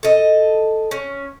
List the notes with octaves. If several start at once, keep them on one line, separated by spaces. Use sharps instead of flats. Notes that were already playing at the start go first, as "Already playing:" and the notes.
A4 D#5
C#4